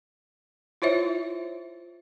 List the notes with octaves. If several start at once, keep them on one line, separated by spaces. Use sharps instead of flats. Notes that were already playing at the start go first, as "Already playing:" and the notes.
E4 F4 C5 C#5 E5